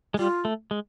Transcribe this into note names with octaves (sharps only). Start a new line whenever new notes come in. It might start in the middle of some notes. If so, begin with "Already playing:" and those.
G#3
G3 F4
A3
G#3